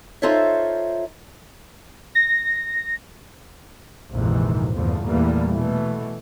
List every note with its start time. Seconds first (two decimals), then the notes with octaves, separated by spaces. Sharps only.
0.22 D#4 F4 A4 C5 C#5 E5
2.15 A#6
4.11 A#1 F2 G#2 C3 D#3 E3
4.75 E2 G2 D3 F3 A3
5.04 E2 A#2 E3 G3 A3 A#3
5.52 B2 E3 A3